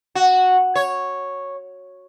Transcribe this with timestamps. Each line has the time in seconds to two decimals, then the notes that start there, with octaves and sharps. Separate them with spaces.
0.15 F#4
0.75 C#5